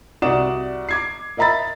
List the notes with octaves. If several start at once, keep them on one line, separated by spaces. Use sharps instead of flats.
C2 F#4 D5 D#6 E7
D6 G#6 C7
A#4 D#5 E5 A#5 B5 A6